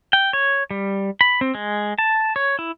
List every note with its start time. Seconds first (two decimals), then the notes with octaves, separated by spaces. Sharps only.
0.13 G5
0.33 C#5
0.71 G3
1.21 B5
1.41 C4
1.55 G#3
1.99 A5
2.36 C#5
2.59 E4